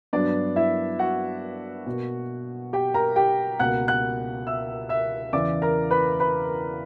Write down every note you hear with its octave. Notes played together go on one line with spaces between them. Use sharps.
G2 F#3 B3 D4 D5
E4 E5
F#4 F#5
B2 A#3
G4 G5
A#4 A#5
G4 G5
C#2 B2 A#3 F#5 F#6
F#5 F#6
E5 E6
E5 E6
E2 C#3 E3 D5 D6
A#4 A#5
B4 B5
B4 B5